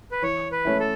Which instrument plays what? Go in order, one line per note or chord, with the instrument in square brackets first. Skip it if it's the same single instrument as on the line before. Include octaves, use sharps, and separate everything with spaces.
[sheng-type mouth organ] B4
[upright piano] E3 [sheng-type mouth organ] C#5
[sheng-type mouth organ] B4
[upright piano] A3 C#4 E4
[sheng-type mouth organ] A4